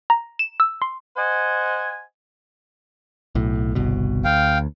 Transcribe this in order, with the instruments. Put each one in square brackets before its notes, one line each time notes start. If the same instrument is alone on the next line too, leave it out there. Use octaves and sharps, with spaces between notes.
[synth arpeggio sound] A#5
E7
E6
C6
[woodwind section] C5 D#5 F#5 G#5
[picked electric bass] B1 A2
G1 C2 B2
[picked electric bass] D2 [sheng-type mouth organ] F5 G5